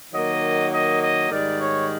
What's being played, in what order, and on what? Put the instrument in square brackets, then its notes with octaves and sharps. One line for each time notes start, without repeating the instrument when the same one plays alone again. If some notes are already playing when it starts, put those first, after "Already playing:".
[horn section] D#3 F#3 A#3 D#5
D#5
D#5
G#2 D#3 G3 D5
C#5